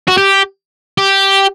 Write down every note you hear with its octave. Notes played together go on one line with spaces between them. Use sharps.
F#4
G4
G4